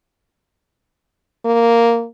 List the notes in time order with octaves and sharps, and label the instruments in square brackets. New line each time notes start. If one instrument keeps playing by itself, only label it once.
[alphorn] A#3